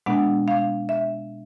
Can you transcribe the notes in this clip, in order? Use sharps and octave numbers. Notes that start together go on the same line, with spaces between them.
B2 G#3 B3 D4 F#5
F5
E5